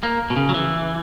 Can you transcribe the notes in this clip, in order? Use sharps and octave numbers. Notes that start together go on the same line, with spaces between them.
A#3
B2
C#3
F#3
E3